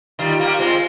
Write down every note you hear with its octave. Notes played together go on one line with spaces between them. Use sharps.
D#3 G3 F4
G3 A#3
G#3 C4